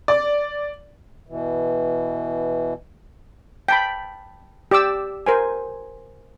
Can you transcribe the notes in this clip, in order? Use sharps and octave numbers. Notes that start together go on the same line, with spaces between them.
D5
B2 E3
G5 A5 B5
G4 D5 D6 E6
A#4 C5 G#5